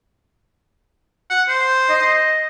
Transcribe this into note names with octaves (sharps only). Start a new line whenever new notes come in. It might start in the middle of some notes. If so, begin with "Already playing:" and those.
F#5
C5
D#5